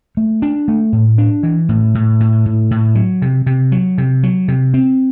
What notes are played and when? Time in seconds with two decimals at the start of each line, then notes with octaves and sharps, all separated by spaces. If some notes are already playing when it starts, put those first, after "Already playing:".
0.17 A3
0.42 D4
0.68 A3
0.93 A2
1.18 D4
1.43 E3
1.69 A2
1.95 A2
2.20 A2
2.46 A2
2.71 A2
2.95 F#3
3.22 C3
3.46 C3
3.72 F#3
3.98 C3
4.23 F#3
4.48 C3
4.74 C4